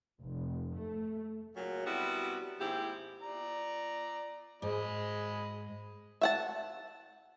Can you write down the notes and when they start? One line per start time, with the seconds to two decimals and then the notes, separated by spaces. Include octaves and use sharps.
0.21 F1
0.75 A3
1.55 F#2 A#2 C#3 F#3
1.85 C3 G3 B3 E4 F#4
2.60 D#2 G#2 C4 E4 G4
3.22 D5 A#5
4.62 G#2 G#3 D#5 B5
6.21 E5 F#5 A5